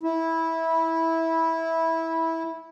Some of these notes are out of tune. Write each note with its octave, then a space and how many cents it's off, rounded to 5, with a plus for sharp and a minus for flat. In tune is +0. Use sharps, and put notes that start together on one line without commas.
E4 -15